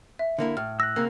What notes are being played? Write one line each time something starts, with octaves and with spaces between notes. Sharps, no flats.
E5
D3 A#3 E4
A2 F6
E6 F#6 A#6
C#3 A#3 C4